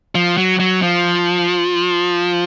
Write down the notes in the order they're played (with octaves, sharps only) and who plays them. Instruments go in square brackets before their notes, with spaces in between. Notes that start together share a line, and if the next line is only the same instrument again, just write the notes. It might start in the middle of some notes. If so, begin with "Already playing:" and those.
[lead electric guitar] F3
F#3
F#3
F3